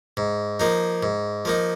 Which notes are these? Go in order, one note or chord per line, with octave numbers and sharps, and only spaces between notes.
G#2
F3 A#3 D#4
G#2
F3 A#3 D#4